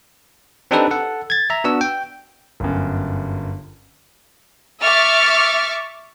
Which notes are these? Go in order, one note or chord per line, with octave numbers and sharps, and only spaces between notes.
C4 D4 D#4 G4 A4 B4
A4 F#5
G#6 A6
E5 A#5
B3 D4 F#4 E6
G5
G1 F#2
E5 C#6 D6 F6 A6